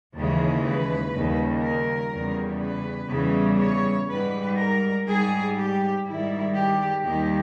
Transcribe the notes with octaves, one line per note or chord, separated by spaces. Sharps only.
D#2 C#3 E3 G#3
B4
D#2 C#3 G3
A#4
E2 C#3 G3
B4
E2 C#3 E3 G3
C#5
G#2 G3 B4
A#4
G#2 G3 G#4
G4
G#2 D#3 G3 E4
G4
D#2 D#3 G3 G4